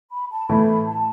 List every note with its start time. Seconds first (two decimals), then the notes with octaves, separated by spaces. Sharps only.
0.12 B5
0.31 A5
0.49 A2 E3 A3 E4 B5
0.86 A5